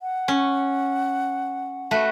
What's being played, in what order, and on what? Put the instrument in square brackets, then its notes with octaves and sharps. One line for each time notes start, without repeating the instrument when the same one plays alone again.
[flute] F#5
[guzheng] C#4
A3 F#4 B4